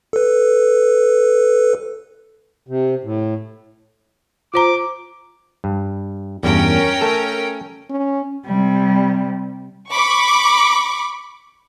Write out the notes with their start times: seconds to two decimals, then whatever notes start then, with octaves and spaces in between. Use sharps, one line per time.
0.13 A4 B4
2.67 C3
3.04 A2
4.54 F4 C5 A#5 D6
5.64 G2
6.43 E2 G2 C#4 A#4 G5
7.01 A3 A4
7.90 C#4
8.46 C3 G3
9.91 B5 C#6 D6